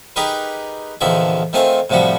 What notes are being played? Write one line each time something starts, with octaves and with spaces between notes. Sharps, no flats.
D#4 G4 G#4 A#4 B4
A#1 E2 D3 D#3 F3 E5
D#3 A3 C4 F4 G#5
A2 C3 F3 G3 F#4